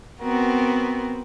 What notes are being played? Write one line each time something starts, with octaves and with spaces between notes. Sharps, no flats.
B3 C4 F#4 A#4